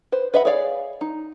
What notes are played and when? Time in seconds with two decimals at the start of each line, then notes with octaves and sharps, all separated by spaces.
0.12 B4 C5
0.34 B4 D#5 E5 F#5 B5
0.45 G#4 C#5 D5 F5
1.01 D#4